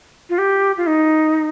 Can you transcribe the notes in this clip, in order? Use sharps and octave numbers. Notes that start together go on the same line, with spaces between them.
F4
G4
F4
D#4